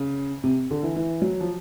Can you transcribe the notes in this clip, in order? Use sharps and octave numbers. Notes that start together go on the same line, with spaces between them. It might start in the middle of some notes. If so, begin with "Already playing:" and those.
Already playing: C#3
C3
D3
E3
E3
F#3
F3